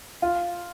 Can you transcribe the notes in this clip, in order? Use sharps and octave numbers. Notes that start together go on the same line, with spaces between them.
F4